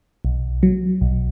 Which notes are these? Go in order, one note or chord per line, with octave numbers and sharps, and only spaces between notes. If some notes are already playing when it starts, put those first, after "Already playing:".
B1
F#3
B1